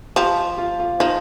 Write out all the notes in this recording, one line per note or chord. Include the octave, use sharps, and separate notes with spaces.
F3 G4
F4
F4
F3 D#4